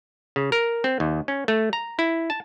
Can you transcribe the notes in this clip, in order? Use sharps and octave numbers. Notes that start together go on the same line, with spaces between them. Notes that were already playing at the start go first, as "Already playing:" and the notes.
C#3
A#4
C4
D#2
C#4
A3
A#5
E4
A5